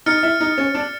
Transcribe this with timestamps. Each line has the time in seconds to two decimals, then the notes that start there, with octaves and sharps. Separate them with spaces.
0.06 D#4 F6 A6 C#7
0.23 E4
0.41 D#4
0.58 C#4
0.75 D4